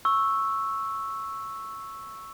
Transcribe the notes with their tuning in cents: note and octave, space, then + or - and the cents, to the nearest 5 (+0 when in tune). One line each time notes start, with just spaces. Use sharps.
C#6 -10 E6 +0